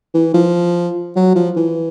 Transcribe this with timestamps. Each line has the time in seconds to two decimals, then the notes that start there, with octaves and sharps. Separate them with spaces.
0.15 E3
0.34 F3
1.16 F#3
1.35 F3
1.56 E3